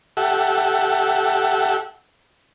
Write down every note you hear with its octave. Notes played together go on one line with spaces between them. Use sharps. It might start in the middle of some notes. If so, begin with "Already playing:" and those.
G4 A4 E5 F#5